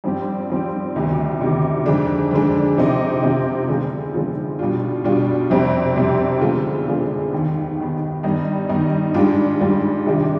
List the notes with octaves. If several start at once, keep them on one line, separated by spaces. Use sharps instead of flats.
G2 F3 C4 G4
G2 F3 C4 G4
D2 C3 D#3 B3
D2 C3 D#3 B3
F2 D3 G#3 D4
F2 D3 G#3 D4
C3 F3 C4 D#4
C3 F3 C4 D#4
D3 F3 G#3 B3 F4
D3 F3 G#3 B3 F4
B2 G3 D4 F4
B2 G3 D4 F4
F2 C3 G3 C4
F2 C3 G3 C4
D3 G#3 B3 F4
D3 G#3 B3 F4
D#2 D#3 B3
D#2 D#3 B3
G2 D#3 B3 D#4
G2 D#3 B3 D#4
G#2 G3 D4 F4
G#2 G3 D4 F4
C3 D#3 G#3 D4 F4